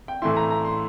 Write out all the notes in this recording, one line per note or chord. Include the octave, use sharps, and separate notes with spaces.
G5
A2 E3 A3 E4 C6
A#5
A#5
C6